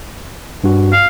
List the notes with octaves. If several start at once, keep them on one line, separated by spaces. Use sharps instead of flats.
G2 F#4
F5